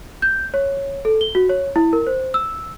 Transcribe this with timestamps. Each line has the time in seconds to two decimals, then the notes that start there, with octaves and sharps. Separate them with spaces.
0.22 G6
0.54 C#5
1.05 A4
1.21 G7
1.35 F#4
1.49 C#5
1.76 E4
1.93 A#4
2.07 C5
2.34 E6